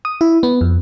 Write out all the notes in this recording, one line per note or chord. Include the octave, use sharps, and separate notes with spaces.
D#6
E4
B3
F2